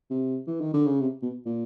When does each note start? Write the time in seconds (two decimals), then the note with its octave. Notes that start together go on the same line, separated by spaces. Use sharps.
0.10 C3
0.47 E3
0.61 D#3
0.74 D3
0.87 C#3
1.00 C3
1.22 B2
1.46 A#2